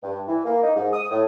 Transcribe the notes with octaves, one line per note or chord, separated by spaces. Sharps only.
G2
E3
A#3
D#4
G#2
D#6
A2